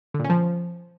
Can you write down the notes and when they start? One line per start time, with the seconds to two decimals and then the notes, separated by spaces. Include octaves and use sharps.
0.14 D3
0.19 A#2
0.25 C#4
0.30 F3